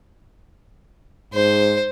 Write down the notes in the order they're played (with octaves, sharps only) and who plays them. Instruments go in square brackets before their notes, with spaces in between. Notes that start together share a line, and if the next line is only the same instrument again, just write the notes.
[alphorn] G#2 [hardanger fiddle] C5